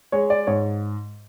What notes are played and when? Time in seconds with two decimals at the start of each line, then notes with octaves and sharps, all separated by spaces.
0.12 G#3 C#5
0.30 D5
0.47 G#2 C#5